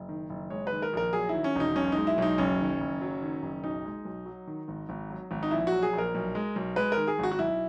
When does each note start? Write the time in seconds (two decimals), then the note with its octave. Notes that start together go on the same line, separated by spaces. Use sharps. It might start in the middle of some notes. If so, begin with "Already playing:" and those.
Already playing: F#1
0.09 D#3
0.30 F#1
0.50 G#3 C#5
0.67 D#3 B4
0.82 A#4
0.93 A#1 A#4
1.13 F#3 G#4
1.29 E4
1.34 D#3
1.44 C#4
1.56 E1 D#4
1.76 B1 C#4
1.92 G#3 D#4
2.07 E4
2.18 B1 D#4
2.38 F#1 C#4
2.59 D#3
2.80 F#1
3.01 F#3
3.22 D#3
3.42 F#1
3.64 B1 D#4
3.85 G#3
4.05 B1
4.26 F#3
4.47 D#3
4.68 G#1
4.89 G#1
5.10 F#3
5.31 G#1
5.43 D#4
5.51 A#1 E4
5.67 F#4
5.72 F#3
5.82 G#4
5.93 A#1
5.98 A#4
6.15 B1
6.35 G#3
6.56 B1
6.76 G#3 B4
6.92 A#4
6.97 D#3
7.07 G#4
7.19 G#1 F#4
7.31 F#4
7.39 B1 E4